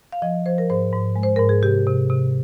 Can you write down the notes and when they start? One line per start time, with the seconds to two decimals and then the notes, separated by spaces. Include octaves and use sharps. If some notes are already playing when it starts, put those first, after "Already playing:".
0.12 F5
0.22 F3 D#5
0.46 F3 C5
0.58 A#4
0.70 G#2 C5
0.93 G#2
1.16 G#3
1.23 C5
1.36 G#2 A#4
1.49 G#4
1.62 C3 G4
1.87 C3
2.10 C3